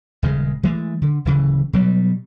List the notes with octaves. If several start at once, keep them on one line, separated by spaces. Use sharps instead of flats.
D#1 C#3 G#3
E3 G#3 A3
D3
D1 C#3 E3
B2 F#3 G3